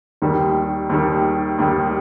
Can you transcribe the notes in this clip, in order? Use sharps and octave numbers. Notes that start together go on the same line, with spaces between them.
D#2 D#3 G3
D#2 D#3 G3
D#2 D#3 G3